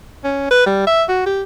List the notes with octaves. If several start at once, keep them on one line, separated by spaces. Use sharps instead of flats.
C#4
B4
G3
E5
F#4
G4